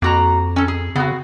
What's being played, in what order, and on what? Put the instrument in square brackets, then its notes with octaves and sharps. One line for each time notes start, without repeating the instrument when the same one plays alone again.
[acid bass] F2 [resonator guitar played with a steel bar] A#3 F#4 A#5
[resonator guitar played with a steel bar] C#4 A4
G#4
[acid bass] C#3 [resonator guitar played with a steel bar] B3 C4 F#4